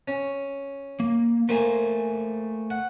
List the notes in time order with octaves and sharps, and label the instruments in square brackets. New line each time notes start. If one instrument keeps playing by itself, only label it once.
[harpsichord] C#4
[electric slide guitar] A#3
[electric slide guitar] A3 C5 G#5 [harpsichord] A#3
[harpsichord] F#5